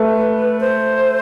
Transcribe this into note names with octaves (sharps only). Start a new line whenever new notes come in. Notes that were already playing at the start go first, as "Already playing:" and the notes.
Already playing: A3 B4
C5